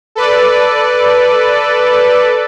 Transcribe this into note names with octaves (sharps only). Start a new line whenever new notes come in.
A4 B4 D5